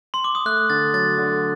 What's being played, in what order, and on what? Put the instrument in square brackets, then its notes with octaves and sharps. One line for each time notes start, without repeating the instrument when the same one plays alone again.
[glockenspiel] C6
D6
D#6
[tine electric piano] A3 [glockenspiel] F#6
[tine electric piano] D3 [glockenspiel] A6
[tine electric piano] F#3 [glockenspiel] A6
[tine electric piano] D3